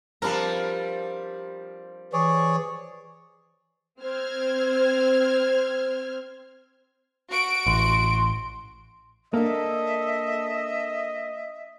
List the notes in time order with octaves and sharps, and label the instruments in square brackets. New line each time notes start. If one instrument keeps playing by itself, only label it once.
[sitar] F3 G3 C4 [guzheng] D4 A#4
[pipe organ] E3 [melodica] G#4 C#5 D5
[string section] C4 C5 F6 G#6
[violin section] F#4 D7
[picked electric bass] A1 [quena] C6
[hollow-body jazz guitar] A#3 D4 [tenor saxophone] A4 [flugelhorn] D#5 [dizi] E5